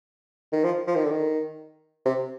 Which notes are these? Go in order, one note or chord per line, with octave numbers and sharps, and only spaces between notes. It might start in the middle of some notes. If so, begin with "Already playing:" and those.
D#3
F3
F3
D#3
D3
D#3
C3